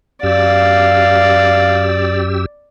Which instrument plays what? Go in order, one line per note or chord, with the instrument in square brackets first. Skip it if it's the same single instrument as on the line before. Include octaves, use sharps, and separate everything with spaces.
[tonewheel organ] F#2 G4 E6 [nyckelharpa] D5 [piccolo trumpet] F5